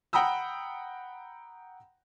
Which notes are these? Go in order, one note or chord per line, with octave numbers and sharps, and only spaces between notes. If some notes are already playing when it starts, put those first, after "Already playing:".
F#5 G5 A#5 B5 D#6 E6